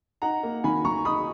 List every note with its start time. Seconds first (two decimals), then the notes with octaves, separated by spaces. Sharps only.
0.22 D#4 F#5 A#5
0.43 A#3
0.64 D#3 G#5 B5
0.84 D#3 A#5 C#6
1.05 D#4 B5 D#6